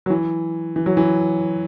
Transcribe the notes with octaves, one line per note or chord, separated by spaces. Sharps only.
F#3
E3
E3
F#3
E3